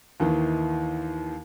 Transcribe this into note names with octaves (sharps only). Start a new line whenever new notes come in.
D#2 D#3 E3